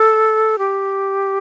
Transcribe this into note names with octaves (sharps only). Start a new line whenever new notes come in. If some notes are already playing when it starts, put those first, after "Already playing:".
Already playing: A4
G4